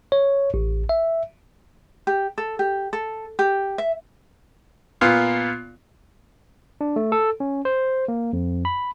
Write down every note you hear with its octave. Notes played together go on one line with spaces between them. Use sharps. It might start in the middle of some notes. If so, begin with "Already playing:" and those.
C#5
A1
E5
G4
A4
G4
A4
G4
E5
A#2 B3 F4
D4
A3
A4
C#4
C5
A#3
F2
B5